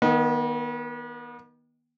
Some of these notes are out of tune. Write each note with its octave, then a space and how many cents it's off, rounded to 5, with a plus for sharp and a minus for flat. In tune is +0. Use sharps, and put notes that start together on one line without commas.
D#3 +0 B3 -35 D#5 +0